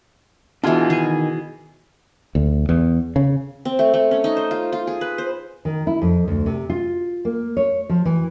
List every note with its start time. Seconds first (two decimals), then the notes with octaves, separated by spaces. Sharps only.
0.64 B2 E3 D4 F4 G#4
0.90 D#3 G#4 G#5
2.35 D2
2.69 E2
3.16 C#3
3.65 C4
3.79 A3
3.94 A3
4.11 C#4
4.24 D#4
4.37 C5
4.51 F4
4.73 F4
4.87 G#4
5.01 B4
5.18 C5
5.65 D#3
5.87 E4
6.02 F2
6.28 D2
6.46 C3
6.70 F4
7.25 A#3
7.57 C#5
7.89 F3
8.05 E3